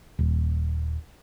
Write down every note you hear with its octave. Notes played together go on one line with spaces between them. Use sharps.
D#1